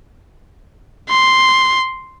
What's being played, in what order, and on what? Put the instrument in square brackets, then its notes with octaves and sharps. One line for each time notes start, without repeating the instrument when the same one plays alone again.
[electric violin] C6